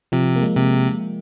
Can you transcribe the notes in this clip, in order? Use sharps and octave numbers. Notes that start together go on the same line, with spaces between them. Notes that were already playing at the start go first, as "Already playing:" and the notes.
C3 F3
A#3
G#3
C3